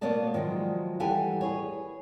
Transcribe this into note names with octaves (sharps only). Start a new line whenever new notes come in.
B2 A#3 B3 C#5 D5 A5
D#3 F3 F#3 G#3
E3 G3 G4 A4 F#5 G#5
G#4 B4 C#5